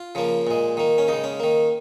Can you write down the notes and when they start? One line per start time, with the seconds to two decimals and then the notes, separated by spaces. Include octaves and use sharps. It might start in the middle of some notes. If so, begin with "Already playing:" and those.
Already playing: F4
0.15 C#3 F3 A#3
0.47 A#2 G#3
0.77 D#3 A#3
0.98 C#4
1.08 C#3 G#3 D#4
1.24 C#4
1.40 D#3 A#3